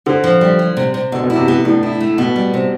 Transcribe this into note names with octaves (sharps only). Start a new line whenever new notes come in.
D3 C4
F3
G3
G3
C3
C3
B2 D3
B2
E4
C3
C3 B3
A2 D4
E4
A3
B2 B3
G3
C3